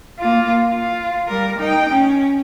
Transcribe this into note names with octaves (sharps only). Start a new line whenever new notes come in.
A#3 F4
F4
G3 A#4
D#4 G5
C#4